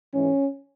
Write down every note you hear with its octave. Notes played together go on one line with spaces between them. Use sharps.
G#2 E3 G#3 C#4